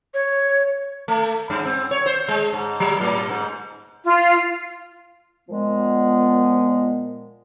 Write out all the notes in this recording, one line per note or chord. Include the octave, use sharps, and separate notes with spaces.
C#5
A3
G2
C4
C#5
C5
G#3
G#2
F#3
A2
G#2
F4
A#2 F3 G#3 B3